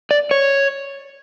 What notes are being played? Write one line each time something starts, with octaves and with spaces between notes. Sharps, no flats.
D5
C#5